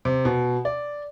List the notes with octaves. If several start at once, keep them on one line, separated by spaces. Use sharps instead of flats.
C3
B2
D5